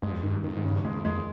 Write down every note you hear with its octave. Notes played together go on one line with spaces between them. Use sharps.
G2 G#3
F2
G2 D#3
F2 D#3
G#2
G2 C#3
F2 G#3
F2 G#3